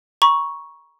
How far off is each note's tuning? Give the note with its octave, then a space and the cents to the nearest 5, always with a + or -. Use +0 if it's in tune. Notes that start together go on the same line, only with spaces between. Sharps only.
A#5 +35 C#6 +0